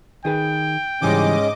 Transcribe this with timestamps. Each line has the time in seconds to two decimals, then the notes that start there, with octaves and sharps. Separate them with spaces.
0.25 D#3 G#4 B4 G5
1.02 G#2 C#3 E3 G3 G#3 C#4 D#5 D6